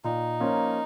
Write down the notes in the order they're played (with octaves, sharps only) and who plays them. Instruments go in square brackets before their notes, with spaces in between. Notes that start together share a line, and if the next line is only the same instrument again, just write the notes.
[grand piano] A#2 [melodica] D#4
[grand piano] F3 A#3 C#4 F4